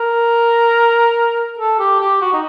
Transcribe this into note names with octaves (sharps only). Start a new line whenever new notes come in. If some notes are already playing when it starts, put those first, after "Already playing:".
Already playing: A#4
A4
G4
G4
F#4
D#4